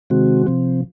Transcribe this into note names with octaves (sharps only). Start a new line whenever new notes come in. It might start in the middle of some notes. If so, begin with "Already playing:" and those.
C3 D#3 G#3 C4 F#4
C3 F3 C4